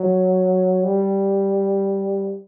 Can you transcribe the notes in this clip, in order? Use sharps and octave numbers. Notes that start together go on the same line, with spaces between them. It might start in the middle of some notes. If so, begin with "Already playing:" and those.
Already playing: F#3
G3